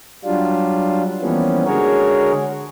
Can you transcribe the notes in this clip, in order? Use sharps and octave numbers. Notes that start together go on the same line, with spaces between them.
F#3 G3 D4 F4
E3 F3 G3 A#3 B3 C#4
D3 G#3 F#4 G#4 A#4 C#5